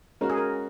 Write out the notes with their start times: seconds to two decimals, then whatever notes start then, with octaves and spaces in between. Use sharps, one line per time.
0.21 G#3 C#4 F#4 A#4
0.30 G#4
0.38 A#4